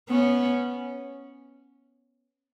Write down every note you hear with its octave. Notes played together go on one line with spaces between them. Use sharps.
B3 C#4